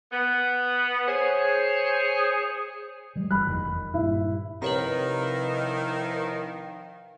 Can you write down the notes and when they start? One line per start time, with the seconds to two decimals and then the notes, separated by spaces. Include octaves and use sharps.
0.12 B3
1.08 G#4 C5 C#5
3.16 E3 G3 G#3
3.31 G1 B5 F#6
3.46 F1 E2 D#3
3.94 G2 A#2 E4
4.62 C3 D#3 F3 E4 B4 C#5 F5 A#5